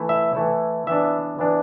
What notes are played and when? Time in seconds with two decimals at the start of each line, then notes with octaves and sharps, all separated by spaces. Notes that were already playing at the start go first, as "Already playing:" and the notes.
Already playing: E3 A3 E4
0.09 E5
0.35 E3 A3 E4
0.87 E3 B3 D4 E5
1.39 E3 B3 D4